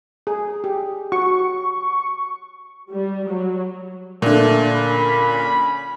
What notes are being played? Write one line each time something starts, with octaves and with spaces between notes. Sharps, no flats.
G#4
G4
F#4 C#6
G3
F#3
A#2 D3 A3
C#4 B5